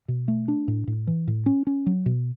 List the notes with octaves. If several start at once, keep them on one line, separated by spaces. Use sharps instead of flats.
B2
A3
D4
A2
A2
E3
A2
C#4
C#4
F#3
B2